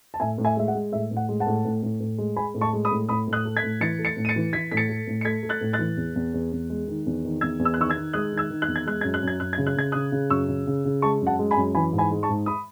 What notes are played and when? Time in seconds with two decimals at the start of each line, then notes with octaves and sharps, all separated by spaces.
0.14 A5
0.20 A2 E5 G#5
0.38 A2
0.45 E5 G#5
0.57 G#3 E5
0.68 F#5
0.74 G#3
0.92 A2 E5
1.11 A2
1.17 F#5
1.29 G#3
1.40 F#5 A5
1.46 A2
1.65 A2
1.83 A2
2.00 A2
2.18 G#3
2.36 G#3 G#5 B5
2.54 A2
2.61 A5 C#6
2.73 G#3
2.85 B5 D#6
2.91 A2
3.09 A2 B5 D#6
3.27 A2
3.33 D#6 F#6
3.45 A3
3.57 G#6 B6
3.63 A2
3.81 E3 A6 C#7
3.99 A3
4.05 A6 C#7
4.17 A2
4.25 D#7
4.29 A6 C#7
4.36 E3
4.53 E3 G#6 B6
4.71 A2 B6
4.77 A6 C#7
4.89 A3
5.07 A2
5.21 C#7
5.25 A3 G#6 B6
5.43 A3
5.49 F#6 A6
5.61 A2
5.73 F#6 A6
5.79 E3
5.97 E2
6.16 E2
6.34 E2
6.52 E2
6.70 G#3
6.88 D#3
7.06 E2
7.24 D#3
7.41 E2 E6 G#6
7.59 E2
7.65 E6
7.74 F#6
7.78 D#3 C#6 E6
7.89 E6 G#6
7.96 D#3
8.13 G#3 D#6 F#6
8.32 D#3
8.37 E6 G#6
8.50 D#3
8.62 F#6
8.68 E2
8.76 G#6
8.86 G#3 F#6
9.01 F#2 G#6
9.14 F#6
9.23 F#2 G#6
9.40 F#2 F#6
9.53 C#3 G#6
9.67 F#6
9.76 C#3 G#6
9.92 C#3 D#6 F#6
10.12 C#3
10.30 F#2 C#6 E6
10.48 C#3
10.67 C#3
10.85 C#3
11.02 G#3 A5 C#6
11.21 F#2
11.27 F#5 A5
11.39 G#3
11.51 G#5 B5
11.57 F#2
11.75 E3 G#5 B5
11.93 G#2
11.98 G#5 B5
12.11 G#3
12.23 A5 C#6
12.29 G#2
12.46 B5 D#6